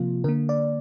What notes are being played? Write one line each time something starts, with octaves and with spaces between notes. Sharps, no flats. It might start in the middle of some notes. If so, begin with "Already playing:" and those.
Already playing: C3 F3 A#3 F4
D3 A#3 A#4
D5